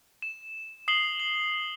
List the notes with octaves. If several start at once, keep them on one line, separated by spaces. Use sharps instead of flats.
E7
D#6 C7 E7 F#7 G7
F#7